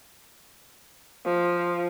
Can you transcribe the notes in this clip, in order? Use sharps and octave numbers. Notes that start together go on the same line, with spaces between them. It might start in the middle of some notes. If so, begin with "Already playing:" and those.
F3